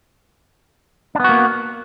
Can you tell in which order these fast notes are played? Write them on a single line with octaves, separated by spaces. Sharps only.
D4 B3 F#4 A#3